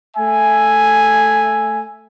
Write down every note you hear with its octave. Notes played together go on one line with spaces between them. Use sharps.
A3 E5 G#5